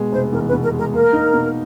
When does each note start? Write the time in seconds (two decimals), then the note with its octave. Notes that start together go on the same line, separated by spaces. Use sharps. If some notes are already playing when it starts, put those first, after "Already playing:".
Already playing: B2 G#3
0.12 F1 C5
0.32 E2 A#4
0.47 B4
0.53 B2
0.63 A#4
0.73 G#3
0.78 A#4
0.93 A#3 A#4
1.13 D#4
1.33 B2